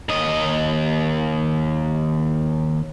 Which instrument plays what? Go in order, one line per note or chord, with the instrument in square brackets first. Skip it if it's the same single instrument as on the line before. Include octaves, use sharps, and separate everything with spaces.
[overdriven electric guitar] D#2 D#5